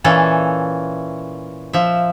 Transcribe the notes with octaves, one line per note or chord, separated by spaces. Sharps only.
A#2 E3 C#4 A4
F3 E5